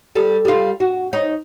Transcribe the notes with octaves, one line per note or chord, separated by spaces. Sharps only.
G3 A4
G3 F4
F#4
D#4 C#5